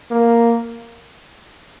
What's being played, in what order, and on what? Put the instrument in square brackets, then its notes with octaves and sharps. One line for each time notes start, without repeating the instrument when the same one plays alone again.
[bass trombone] A#3